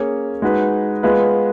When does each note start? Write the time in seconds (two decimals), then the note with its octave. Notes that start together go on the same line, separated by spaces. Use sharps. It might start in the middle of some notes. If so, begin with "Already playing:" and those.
Already playing: A#3 C#4 G#4 C#5
0.42 G#3 D#4 F#4 B4
1.03 G#3 B3 F4 B4